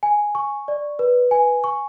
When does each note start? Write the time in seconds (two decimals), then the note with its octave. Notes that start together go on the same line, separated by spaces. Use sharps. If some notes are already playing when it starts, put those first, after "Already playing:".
0.03 G#5
0.35 C#6
0.68 D5
0.99 B4
1.31 G#5
1.64 C#6